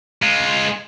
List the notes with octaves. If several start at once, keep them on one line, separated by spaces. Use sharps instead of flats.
G#3 F4